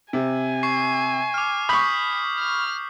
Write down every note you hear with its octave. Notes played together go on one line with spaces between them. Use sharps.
C3 G#5
C#6 C7
D6 F6
B5 C#6 D#6 G6 B6
F6